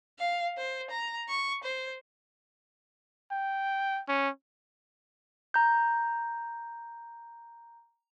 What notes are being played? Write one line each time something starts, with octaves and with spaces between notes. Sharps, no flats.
F5
C5
A#5
C#6
C5
G5
C#4
A#5 G6